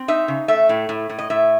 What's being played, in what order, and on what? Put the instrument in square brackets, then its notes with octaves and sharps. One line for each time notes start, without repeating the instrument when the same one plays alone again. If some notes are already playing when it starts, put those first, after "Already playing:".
Already playing: [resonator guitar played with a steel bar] C4
D#4 E5
C#3
A3 E5
A2
A2
A2
D#5
A2 E5